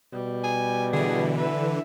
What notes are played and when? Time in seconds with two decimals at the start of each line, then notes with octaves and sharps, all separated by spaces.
0.13 B2 G3
0.44 G#5
0.93 D3 E3 G#4
1.38 B4 E5